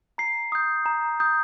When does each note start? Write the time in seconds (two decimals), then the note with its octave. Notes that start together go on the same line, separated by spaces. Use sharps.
0.18 A#5 C7
0.52 D#6 G6
0.86 A#5
1.20 D#6 G6